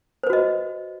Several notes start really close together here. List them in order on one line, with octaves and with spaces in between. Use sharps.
C5 B4 F#4 D#5